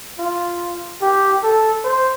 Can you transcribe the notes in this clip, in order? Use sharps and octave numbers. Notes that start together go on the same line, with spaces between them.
F4
G4
A4
C5